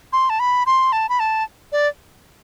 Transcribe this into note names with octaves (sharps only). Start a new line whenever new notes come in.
C6
A5
B5
C6
A5
B5
A5
D5